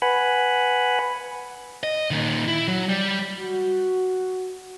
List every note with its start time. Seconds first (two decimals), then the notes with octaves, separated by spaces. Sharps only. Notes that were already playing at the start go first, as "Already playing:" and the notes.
0.02 B4 F#5 G#5 B5
1.83 D#5
2.11 A#2 D#3
2.48 E4
2.68 F#3
2.89 G3
3.39 F#4